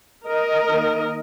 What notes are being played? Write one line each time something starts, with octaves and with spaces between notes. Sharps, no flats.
A#4 D#5
D#3 A#3